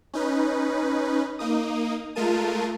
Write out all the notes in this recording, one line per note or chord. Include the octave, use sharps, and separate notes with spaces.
C#4 D#4 B4
A#3 D#4 D#6
G#3 A3 F4 A#4 A5 D#7